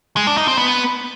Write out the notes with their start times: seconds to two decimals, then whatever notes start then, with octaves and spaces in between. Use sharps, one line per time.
0.17 G#3
0.27 D4
0.37 D#4
0.48 C4
0.58 B3